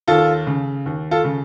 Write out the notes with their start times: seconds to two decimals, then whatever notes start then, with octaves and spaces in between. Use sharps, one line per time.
0.08 D#2 F4 A4
0.47 C#3
0.86 D#2
1.11 F4 A4
1.24 C#3